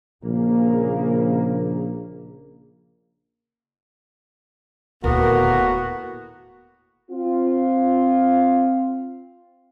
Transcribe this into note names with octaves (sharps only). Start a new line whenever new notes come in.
A#1 C#3 A#3
D#1 D2 A2 A#3 B3 F#4 A#4
C4 F4